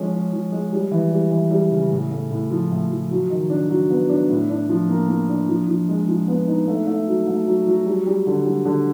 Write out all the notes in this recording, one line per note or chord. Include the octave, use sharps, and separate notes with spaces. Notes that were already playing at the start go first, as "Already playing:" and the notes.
Already playing: F3 G#3 C#4
C#4
F3
G#3
G3
E3
G3
E3
G3
C#3
A2
A3
A2
F3
A2
F3
F#3
D#3
D4
F#3
B3
D4
A2
D4
F3
A#3
A#3
D4
F3
F3
G#3
F3
B3
D#4
A3
A3
F#3
A3
F#3
F#3
G3
G3
D3
G3
D3